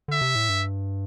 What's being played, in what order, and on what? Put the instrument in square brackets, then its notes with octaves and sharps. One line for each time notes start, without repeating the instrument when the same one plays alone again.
[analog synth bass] D3 [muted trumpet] E5
[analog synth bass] C3
A2
G2